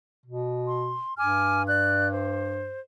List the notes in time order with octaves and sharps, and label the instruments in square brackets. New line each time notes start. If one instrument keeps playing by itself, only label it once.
[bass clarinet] B2
[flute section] C6
[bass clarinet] G2 [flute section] G#5 D6 F6
[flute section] D5 F#6
C5